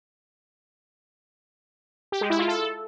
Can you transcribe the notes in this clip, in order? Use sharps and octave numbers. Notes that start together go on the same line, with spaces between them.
G4
G#3
E4
F4
A4